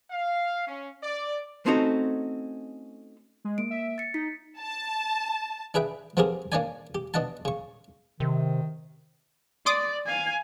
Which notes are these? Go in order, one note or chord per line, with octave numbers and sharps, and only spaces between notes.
F5
C#4
D5
A3 C4 C#4 D#4 F#4 A4
G#3
A#3 D7
E5
A6 C#7
D#4 B6
A5
D4 G#4 B4 E5 G5
F3 B3 C4 G4 G#4 A#4
A#3 C#4 D4 C#5 D5 G#5
G4
B2 D4 D#5 F#5 A5
C#3 C#6
C3 D#3
D5 C6 D6 D#6
F5 G#5